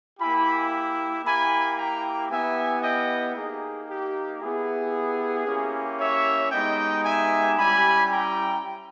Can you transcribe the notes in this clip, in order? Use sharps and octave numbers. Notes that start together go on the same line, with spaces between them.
A#3 E4 G4 G#5 B5
A#3 E4 G4 G#5 B5
G5 A#5
B3 E4 G4 E5 G#5
D#5 G5
A#3 D#4 G4 G#4
G4
B3 E4 G4 G#4
A#3 C#4 E4 G4
C#5 E5
G#3 B3 D#4 G4 D#5 G5
E5 G#5
G3 C#4 E4 G4 G#5 B5
G5 A#5